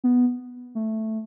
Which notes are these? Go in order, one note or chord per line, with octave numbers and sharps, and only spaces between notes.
B3
A3